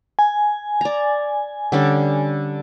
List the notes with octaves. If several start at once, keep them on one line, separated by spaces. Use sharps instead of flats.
G#5
D5 A#5
D3 G3 C#4